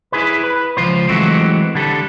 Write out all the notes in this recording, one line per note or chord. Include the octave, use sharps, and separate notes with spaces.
E4 G#4 B4
B4
C#2 F3 F4 C5
E3 F#3 G#3 A3 C4
D3 G3 A4